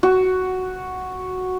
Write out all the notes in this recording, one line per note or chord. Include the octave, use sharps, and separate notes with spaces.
F#4